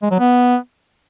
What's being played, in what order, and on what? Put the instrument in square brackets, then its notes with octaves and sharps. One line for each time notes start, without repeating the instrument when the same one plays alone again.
[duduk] G#3
F#3
B3